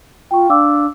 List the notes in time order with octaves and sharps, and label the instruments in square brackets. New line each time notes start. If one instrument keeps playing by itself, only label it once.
[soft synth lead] F4 [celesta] G5 C#6
[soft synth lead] D4 [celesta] F5 D6 E6